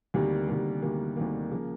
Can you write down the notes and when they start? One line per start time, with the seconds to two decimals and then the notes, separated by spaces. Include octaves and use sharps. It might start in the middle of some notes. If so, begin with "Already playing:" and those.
0.14 D2 C3 D#3 G3 A#3
0.48 D2 C3 D#3 G3 A#3
0.82 D2 C3 D#3 G3 A#3
1.16 D2 C3 D#3 G3 A#3
1.51 C#3 F3 A#3